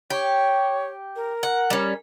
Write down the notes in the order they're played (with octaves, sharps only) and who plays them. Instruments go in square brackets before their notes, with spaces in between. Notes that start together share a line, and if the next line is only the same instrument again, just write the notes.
[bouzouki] G4 [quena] C#5
[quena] A#4
[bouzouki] F#5
G3 C#4